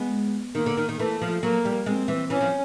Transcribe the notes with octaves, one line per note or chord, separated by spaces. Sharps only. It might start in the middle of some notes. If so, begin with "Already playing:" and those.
Already playing: G#3 B3
D#3 A#3
D3
D#3
D#3
E3 A3
F3
F#3 A#3
G3
G#3 C4
E3
E3 C#4
F3